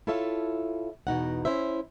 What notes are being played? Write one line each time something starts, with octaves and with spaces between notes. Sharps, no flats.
E4 F4 A4 C#5 E5 F5
E2 B2 D#4 F#5
C#4 E4 C5 E5